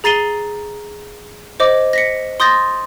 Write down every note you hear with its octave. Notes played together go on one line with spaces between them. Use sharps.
G#4 A#5 A6 C7 D#7 G7
C5 D#5 D6
A#6 B6 C#7
C6 D#6 G6 A6 A#6